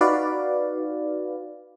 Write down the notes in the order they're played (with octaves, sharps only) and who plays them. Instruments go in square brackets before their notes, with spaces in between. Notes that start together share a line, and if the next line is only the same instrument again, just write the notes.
[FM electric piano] D#4 F#4 B4 D5 F5